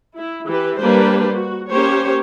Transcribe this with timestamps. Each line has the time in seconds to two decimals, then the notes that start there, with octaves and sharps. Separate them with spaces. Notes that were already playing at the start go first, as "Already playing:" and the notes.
0.14 E4
0.45 E3 G4 B4
0.79 G3 A#3 D4 B4 C5
1.34 F#4
1.71 A#3 C#4 G4 C5 C#5